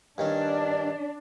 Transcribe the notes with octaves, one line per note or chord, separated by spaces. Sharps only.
G2 D#3 C#4 D4